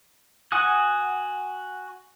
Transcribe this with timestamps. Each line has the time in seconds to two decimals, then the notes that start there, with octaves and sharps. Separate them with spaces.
0.52 F#4 F#5 G#5 D#6 F#6